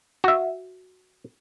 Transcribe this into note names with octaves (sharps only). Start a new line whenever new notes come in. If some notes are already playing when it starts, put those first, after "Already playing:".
F#4 E5